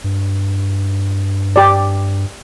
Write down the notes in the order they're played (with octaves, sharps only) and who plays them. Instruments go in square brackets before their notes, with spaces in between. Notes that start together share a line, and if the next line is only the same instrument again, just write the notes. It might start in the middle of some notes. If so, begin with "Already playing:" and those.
[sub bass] G2
[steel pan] G4 D5